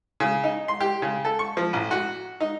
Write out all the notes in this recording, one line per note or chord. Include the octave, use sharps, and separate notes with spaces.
C#3
D#4
C6
G4
C#3
A4
C#6
F3
A1
F#4
D#4